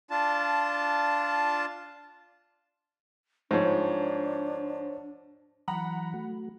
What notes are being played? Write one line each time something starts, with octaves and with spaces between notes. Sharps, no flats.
D4 F4 A5
G#2 F3 D4 C5 C#5
E3 F#3 F#5 A#5 B5
A3 F#4